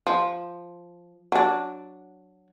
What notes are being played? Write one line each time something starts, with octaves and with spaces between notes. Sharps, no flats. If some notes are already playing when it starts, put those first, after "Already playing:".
F3
F#3 D4